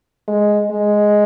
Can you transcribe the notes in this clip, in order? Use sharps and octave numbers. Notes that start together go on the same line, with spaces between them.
G#3
G#3